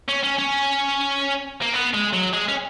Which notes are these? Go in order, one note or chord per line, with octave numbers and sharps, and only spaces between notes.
C#4
C#4
C#4
A#3
B3
G#3
F#3
G#3
C#4